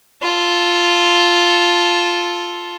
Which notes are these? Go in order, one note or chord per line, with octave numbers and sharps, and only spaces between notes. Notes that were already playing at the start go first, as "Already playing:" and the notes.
F4 A4